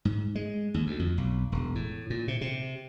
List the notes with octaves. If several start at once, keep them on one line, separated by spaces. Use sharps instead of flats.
G#2
G#3
D#2
D2
F2
B1
E1
A2
A#2
C3
C3